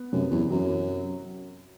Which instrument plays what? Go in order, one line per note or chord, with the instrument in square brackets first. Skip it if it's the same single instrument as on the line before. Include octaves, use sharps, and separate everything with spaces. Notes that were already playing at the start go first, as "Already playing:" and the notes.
Already playing: [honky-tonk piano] B3
[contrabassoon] F#2 [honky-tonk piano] C3
[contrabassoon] E2
[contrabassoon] F#2 [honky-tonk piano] F#3